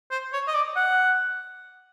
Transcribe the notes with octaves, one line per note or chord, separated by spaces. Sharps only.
C5
C#5
D#5
D5
F#5